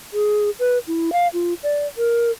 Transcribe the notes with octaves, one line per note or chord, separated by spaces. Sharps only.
G#4
B4
E4
F5
F4
D5
A#4